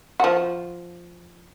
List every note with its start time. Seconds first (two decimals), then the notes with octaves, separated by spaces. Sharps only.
0.20 F3 F#4